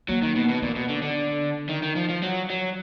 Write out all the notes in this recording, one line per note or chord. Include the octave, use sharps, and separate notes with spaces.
F#3 A#3
D#3
B2
B2
A#2 B3
B2
D3
D3
D#3
D#3
F3
F3
F#3
F#3